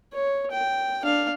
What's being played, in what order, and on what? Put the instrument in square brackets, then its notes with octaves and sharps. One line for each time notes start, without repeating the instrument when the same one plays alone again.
[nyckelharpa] C#5
G5
D4 F5